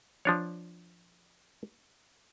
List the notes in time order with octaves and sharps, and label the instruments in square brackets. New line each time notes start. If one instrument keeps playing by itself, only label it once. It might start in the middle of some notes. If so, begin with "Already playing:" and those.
[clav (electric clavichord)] F3 D4 C#5